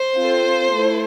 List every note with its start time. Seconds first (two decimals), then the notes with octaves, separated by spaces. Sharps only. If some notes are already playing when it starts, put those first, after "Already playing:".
Already playing: C5
0.15 C4 F4 A4
0.75 A3 E4